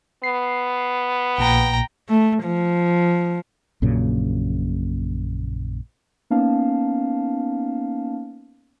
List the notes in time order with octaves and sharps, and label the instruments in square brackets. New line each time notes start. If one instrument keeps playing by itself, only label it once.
[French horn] B3 [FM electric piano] C7
[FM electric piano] A#1 A#2 [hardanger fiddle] G5 A#5
[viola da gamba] A3
F3
[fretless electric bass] A#1 F#2 A#2 C#3
[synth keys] A#3 B3 C#4 D#4 F5 A5